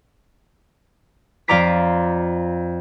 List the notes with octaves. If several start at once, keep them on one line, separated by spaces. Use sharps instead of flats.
F2 F4 D5 A#5 D6 B6